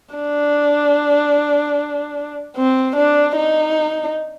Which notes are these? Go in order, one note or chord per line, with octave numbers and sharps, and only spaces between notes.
D4
C4
D4
D#4